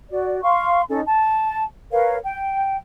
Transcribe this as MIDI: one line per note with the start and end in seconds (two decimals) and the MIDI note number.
0.10 0.40 66
0.10 0.40 74
0.42 0.82 77
0.42 0.82 84
0.42 0.82 85
0.89 1.01 61
0.89 1.01 63
0.89 1.01 69
1.06 1.64 81
1.91 2.16 70
1.91 2.16 71
1.91 2.16 73
1.91 2.16 77
2.23 2.77 79